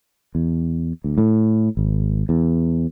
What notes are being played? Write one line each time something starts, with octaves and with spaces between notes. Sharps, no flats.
E2
D2
A2
G#1
E2